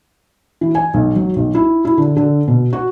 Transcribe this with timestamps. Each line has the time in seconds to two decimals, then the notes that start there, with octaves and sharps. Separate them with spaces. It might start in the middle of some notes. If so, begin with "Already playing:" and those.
0.61 E3
0.75 G#5
0.94 B1
1.16 F#3
1.36 B1
1.55 E4
1.85 E4
1.98 D3
2.17 D3
2.48 B2
2.73 F#4